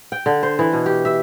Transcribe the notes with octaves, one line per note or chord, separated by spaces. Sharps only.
G5
D3
C5
E3
B2
G4
E5